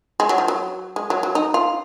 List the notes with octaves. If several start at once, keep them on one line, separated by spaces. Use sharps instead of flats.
G#3
F#3
F3
F#3
G#3
F#3
F#3
D#4
F4